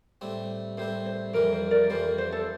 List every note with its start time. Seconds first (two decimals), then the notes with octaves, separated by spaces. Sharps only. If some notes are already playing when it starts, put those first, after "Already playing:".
0.21 A2 G3 C4
0.77 A2 G3 C4 C5
1.06 C5
1.34 F2 E3 G3 A#4
1.53 C5
1.71 A#4 D5
1.90 F2 E3 G3 C5
2.18 C5
2.32 A4